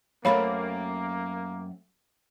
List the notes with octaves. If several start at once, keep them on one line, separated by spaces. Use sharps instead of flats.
F#2 A3 A#3 C4 C#5 F5 B5